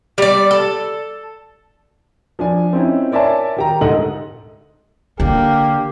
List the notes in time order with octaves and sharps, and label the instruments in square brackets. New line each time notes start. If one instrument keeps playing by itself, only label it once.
[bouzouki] G3 D5
A4
[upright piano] F3 D4 G#5
C4 C#4 D#4 E4
A#4 C#5 D5 E5 G#5 A5
D#3 G4 A#5
D2 G#2 D#4 A4 D#5 F#7
[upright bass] D3 [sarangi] A#3 [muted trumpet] G4